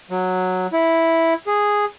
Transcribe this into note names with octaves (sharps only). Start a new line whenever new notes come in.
F#3
E4
G#4